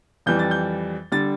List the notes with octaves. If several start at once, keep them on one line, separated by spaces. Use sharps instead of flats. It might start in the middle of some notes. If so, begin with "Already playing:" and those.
F2 E3 G3 G6
A6
G6
D3 G3 A6